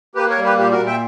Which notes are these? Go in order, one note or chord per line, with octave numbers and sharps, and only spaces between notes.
A#3 G4 B4
A#4 C#5
G3
G4 B4
A#2 G4
F#4 A#4
A#2
E5 G5